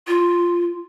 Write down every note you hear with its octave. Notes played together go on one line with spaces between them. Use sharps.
F4